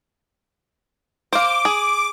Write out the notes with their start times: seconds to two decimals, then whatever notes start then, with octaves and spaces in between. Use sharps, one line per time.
1.33 C5 F5 D6
1.65 G#4